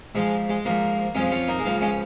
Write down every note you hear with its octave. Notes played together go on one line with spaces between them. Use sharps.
G#2 F3 G#3
G#3
G#2 F3 A#3
F2 F3 G#3 C#4
C#4 F4
A#3 D#4
G#3
C#2 C#3 F3 A#3
G#3 C#4